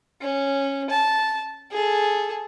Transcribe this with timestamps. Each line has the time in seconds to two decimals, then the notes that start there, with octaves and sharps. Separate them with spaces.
0.21 C#4
0.90 A5
1.71 G#4 A4